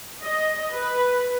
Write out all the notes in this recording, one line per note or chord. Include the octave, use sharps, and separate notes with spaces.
D#5
B4